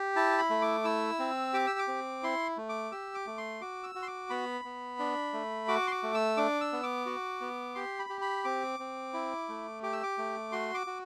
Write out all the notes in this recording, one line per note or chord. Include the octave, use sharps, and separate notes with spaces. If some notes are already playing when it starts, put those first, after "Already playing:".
Already playing: G4
E4 A5
B5
A3
D6
E4 E6
C4
G4 D6
E6
D6
C4
E4 C6
A3
D6
G4 E6
D6
A3
C6
F#4 D6
E6
F#4
C6
D6
B3 B5
B3
D4
A3
F#4 D6
C6
D6
A3
E6
D4 D6
E6
B3
D6
F#4
B3
G4 C6
B5
G4
B5
C4 D6
C4
E4
A3
G4 D6
E6
D6
A3
F#4 C6
D6
F#4